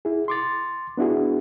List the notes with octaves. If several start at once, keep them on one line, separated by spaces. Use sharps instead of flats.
E4 G#4
C6 D6 A6
B3 D4 E4 F#4 G#4